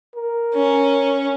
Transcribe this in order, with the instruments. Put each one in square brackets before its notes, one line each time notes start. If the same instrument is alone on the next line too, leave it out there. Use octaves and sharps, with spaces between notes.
[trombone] A#4
[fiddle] C#4